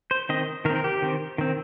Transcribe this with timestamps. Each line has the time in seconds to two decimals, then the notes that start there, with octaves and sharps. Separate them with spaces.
0.11 C5
0.29 D#3 C4 D#5
0.65 D#3 A#4
0.70 C4
0.76 A#4
0.84 G4
1.02 D#3 C4
1.38 D#3 C4